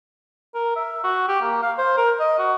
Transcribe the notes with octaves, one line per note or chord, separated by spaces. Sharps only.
A#4
E5
F#4
G4
A#3
F5
C5
A#4
D#5
F#4